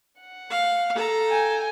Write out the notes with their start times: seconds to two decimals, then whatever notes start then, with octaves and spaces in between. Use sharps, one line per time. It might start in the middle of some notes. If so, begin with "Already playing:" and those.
0.20 F#5
0.50 F5
0.95 A4 A#5
1.28 G5 G#5